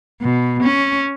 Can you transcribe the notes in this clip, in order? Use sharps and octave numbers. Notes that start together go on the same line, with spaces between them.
B2
C#4